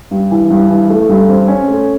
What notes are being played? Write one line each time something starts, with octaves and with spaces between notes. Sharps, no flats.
G2
E3
G2
E3
A3
G2
C4
C#4
A3